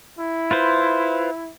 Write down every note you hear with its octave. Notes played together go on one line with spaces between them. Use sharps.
E4
F4 B4 C5